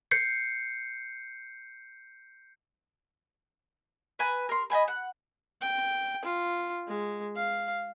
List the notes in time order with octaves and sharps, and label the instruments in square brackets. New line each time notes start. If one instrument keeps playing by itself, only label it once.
[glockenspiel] G6 C7 C#7
[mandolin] B4 G#5 A#5
A#4 C6
D#5 E5 G#5 B5
F#5
[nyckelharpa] G5
F4
G#3
F5